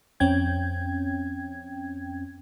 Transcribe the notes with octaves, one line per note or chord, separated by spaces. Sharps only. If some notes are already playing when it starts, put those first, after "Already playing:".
F2 C4 C#4 G5 G#6